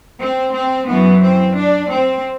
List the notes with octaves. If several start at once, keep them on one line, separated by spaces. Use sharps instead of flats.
C4
C4
F#2 E3 B3
C4
D4
C4